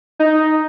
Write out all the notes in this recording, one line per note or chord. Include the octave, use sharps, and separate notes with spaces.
D#4